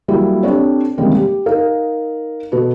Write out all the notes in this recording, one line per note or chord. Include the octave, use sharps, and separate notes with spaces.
F#3 G3 A#3 E4 G#4
C4 D4 G4 A4 C#5
C3 D#3 G3 G#3 A#3 C#4
G4
D#4 A#4 F5
B2 F#4 A4 B4